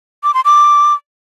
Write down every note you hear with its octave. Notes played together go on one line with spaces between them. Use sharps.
D6
C6
D6